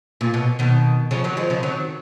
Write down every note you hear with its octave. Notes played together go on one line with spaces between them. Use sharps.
A#2
B2
B2 D#3
C#3 F3
D#3 F#3
F3 G#3
C#3 F3
D#3 F#3